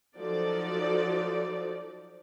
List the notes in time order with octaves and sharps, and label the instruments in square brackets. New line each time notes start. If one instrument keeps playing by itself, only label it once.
[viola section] F3 F#3 D#4 A4 D5